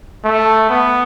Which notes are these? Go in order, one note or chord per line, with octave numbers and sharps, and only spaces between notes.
A3
B3